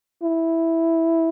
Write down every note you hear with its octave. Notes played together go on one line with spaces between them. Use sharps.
E4